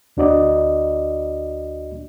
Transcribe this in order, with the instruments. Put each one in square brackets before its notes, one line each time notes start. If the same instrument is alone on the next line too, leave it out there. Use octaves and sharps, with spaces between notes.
[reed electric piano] D2 D4 F#4 D5 D#5